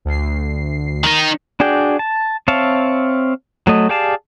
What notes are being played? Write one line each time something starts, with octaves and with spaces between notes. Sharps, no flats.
D2 C7
D#3 D#4
D4 F#4 G#4 D5 G5
A5
C4 C#5 E5 F5 A5
F#3 A3 D#5
G4 G#4 D5 F5 A5